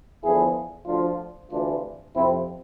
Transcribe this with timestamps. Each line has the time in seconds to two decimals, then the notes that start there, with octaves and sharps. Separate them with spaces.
0.23 E2 D3 F3 E4 G#4
0.87 D2 D3 F3 D4 F4
1.51 D2 C3 E3 D4 F4
2.15 F2 C3 F3 C4 E4